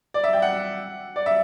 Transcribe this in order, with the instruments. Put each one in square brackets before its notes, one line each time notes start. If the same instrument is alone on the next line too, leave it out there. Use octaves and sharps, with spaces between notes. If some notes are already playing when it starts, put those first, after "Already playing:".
[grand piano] D5
E5
G5
F#5
D5
E5